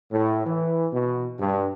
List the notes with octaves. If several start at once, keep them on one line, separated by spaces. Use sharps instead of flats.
A2
E3
B2
G2